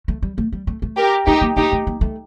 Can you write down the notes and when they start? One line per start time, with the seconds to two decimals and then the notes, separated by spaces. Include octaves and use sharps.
0.08 A3
0.22 G3
0.38 A3
0.52 G3
0.67 A3
0.82 A3
0.97 G4 A#4
1.27 A3 D#4 G4
1.41 A#3
1.57 A#3 D#4 G4
1.72 A3
1.87 A#3
2.01 A3